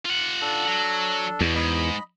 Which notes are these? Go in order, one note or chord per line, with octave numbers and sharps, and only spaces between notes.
F4 F#5
D4 A4
F#3
E2 B2
G#2 D#5 B5